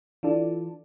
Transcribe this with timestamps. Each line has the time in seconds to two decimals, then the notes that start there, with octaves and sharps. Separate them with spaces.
0.23 E3 D4 F4 A4 D5